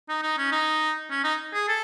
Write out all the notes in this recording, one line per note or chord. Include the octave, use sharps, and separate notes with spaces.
D#4
D#4
C#4
D#4
C#4
D#4
G#4
A4